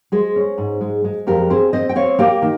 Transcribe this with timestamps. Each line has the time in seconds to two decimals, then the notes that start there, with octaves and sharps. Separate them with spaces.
0.12 G#3 G#4 C5
0.36 C#4
0.58 G#2
0.81 G#3
1.04 G#3
1.27 F2 G4 A#4
1.50 C4 G#4 C5
1.73 C4 C5 D#5
1.89 G5
1.96 C4 C#5 F5
2.19 A#3 G4
2.42 D#3